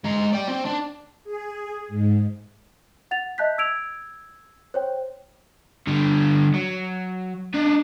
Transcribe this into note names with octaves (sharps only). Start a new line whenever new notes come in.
G#3 A#5
D5 G5
C4
D4
G#4
G#2
F#5 A6 F7
D#5 E5 A5 F#6 G6 B6
E6 G#6 D7 F7
C5 C#5 G5
D3 G3
F#3
D4 D#4